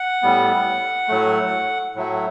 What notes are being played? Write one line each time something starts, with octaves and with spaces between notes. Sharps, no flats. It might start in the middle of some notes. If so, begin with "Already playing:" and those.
Already playing: F#5
A2 G3 B3
A2 F#3 A3
A2 F#3 A3